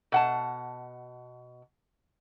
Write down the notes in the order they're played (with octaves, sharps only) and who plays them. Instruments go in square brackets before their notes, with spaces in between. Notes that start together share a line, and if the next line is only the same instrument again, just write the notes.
[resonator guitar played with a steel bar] B2 F#5 A5